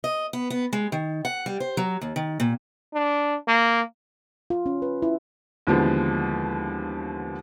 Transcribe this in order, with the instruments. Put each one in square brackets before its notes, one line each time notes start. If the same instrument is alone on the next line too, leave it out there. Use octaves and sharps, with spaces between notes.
[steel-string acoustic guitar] D#5
B3
B3
G#3
D#3
F#5
G3
C5
F#3
D#2
D#3
A#2
[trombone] D4
A#3
[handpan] F4
C#4
B4
E4
[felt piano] D#2 D3 E3 F3 G#3 B3